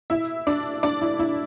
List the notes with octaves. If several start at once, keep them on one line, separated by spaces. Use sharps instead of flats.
E4 E5
D4 D5
D4 D5
E4
E4